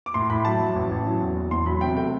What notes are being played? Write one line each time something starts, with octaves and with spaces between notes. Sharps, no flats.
D6
A2 C6
A2 B5
F#3 A5
F#3
A1
A1
F#3
E2
E2
E1 C6
F#3 B5
C3 G5
A3 G5